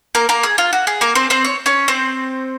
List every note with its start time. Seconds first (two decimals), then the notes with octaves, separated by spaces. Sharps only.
0.15 A#3 A#4
0.29 A#3 A#4
0.43 G#4
0.58 F4
0.73 F#4
0.87 G#4
1.01 A#3 A#4
1.15 C4 C5
1.30 C4 C5
1.45 C#5
1.66 C#4 C#5
1.88 C4 C5